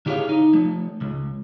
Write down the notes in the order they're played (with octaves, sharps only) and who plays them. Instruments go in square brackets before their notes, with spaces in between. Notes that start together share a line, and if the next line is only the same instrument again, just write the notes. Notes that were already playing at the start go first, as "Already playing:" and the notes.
[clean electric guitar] D3 E4 G4 G#4 C#5 F5
D#4
F3 A3
C#2